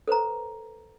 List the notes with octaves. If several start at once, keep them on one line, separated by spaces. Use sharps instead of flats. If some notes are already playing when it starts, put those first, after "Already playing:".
A4 B4 C5 A#5